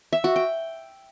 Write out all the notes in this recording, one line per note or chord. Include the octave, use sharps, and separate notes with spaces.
E5
F#4
G5